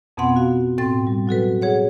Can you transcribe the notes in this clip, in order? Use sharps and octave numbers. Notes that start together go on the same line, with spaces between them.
F2 B2 B3 C4 F#5 C6
F#4 F5
A2 C4 G5 C6 A6
G3
F#3 F#4 A4 B4
G#4 C#5 F#5